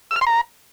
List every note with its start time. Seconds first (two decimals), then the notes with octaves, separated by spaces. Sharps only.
0.11 E6
0.16 F6
0.21 C6
0.27 A#5